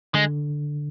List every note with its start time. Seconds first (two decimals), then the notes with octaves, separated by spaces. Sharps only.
0.14 D3 G#3